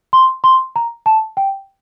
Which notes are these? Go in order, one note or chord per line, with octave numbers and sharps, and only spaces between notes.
C6
C6
A#5
A5
G5